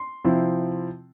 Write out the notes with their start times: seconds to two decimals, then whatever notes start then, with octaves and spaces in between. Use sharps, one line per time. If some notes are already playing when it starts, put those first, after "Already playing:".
Already playing: C6
0.24 C3 F3 C4 E4